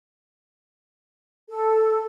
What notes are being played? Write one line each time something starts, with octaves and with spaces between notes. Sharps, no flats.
A4